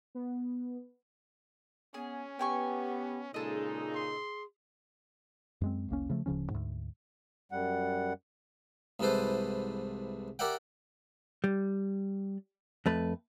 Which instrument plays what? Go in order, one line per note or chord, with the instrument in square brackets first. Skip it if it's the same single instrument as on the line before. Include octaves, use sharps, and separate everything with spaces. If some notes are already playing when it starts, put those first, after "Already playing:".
[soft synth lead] B3
[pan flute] B3 [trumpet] C#4 [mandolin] G#4
[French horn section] B3 [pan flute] G4 [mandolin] G5 G#5 C#6
[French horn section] A#2 C#3 D#4 [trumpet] G#3 [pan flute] G#4 [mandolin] A4 D#5
[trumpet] C6
[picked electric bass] F#2 G#3 C4
F1 C2 A#3 C#4
C#3 F3 A3
D1 C#3 F3 C#4
D2 G#2
[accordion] F#2 G3 F#5
[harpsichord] C2 G#2 E3 A4 B4 C5
G4 A#4 D5 E5 F#5 G5
[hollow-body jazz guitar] G3
F2 A3 B4